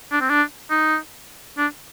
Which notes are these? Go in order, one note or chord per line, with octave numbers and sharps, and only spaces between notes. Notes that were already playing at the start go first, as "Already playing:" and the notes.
D4
C4
D4
D#4
D4